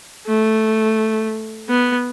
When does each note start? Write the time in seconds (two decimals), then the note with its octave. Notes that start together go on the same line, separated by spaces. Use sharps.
0.27 A3
1.69 B3